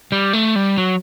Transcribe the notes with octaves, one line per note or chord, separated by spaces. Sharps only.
G3
A3
G3
F#3